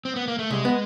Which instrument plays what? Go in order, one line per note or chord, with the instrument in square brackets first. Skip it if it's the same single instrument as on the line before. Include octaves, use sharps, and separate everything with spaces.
[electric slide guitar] C4
B3
A#3
A3
[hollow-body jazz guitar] C2 [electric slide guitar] G#3
[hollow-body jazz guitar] B3